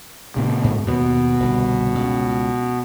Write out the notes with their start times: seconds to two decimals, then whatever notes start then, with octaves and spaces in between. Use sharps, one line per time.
0.36 A#2 C#3
0.64 G#2
0.88 D#2 B2 B3
1.40 G1 C2
1.95 C#2